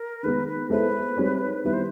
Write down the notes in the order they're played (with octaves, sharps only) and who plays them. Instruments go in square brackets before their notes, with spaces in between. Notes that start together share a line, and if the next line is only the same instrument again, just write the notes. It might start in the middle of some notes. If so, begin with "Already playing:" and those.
Already playing: [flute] A#4
[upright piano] D#3 G#3 B3 [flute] B4
[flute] B4
[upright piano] G#3 B3 E4 A4 C5 [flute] B4
[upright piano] G3 C4 D#4 G#4 C#5
[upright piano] D#3 G3 B3 E4 [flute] B4
[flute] C5